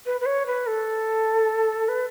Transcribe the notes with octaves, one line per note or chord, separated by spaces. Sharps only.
B4
B4
C#5
B4
A4
B4